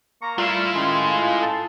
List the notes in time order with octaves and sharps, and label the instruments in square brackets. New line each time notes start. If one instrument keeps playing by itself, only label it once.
[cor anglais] A#3 [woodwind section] A#5 C#6
[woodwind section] G3 [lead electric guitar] A3 E4 [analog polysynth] F4
[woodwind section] D#3 C#4 [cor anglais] G#3
[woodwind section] A4 A5